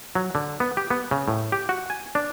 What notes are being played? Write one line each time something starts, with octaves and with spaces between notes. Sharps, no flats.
F#3
D3
B3
G4
B3
C#3
A2
G4
F#4
G#5
D4